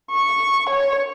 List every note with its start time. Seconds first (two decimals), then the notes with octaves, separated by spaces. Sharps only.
0.11 C#6
0.69 C#5